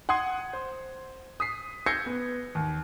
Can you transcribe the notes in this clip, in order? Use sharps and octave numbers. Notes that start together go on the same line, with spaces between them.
F#5 C6 D#6 G#6 C7
C5
D#6 B6 C7
E6 G6 G#6 A#6 C7 C#7
B3
D#2